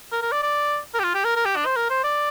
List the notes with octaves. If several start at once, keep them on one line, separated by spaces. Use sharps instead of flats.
A#4
A#4
D5
D5
A#4
G4
F4
G4
A#4
A#4
G4
D4
C5
A#4
C5
D5